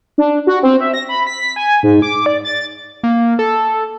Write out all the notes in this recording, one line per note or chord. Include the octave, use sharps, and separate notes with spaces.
D4
F#4
C4
E5
A#6
B5
B6
G#5
G#2
D6
D5
A6
A#3
A4